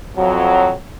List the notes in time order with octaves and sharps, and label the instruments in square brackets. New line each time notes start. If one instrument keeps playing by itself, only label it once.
[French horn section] F2 F#3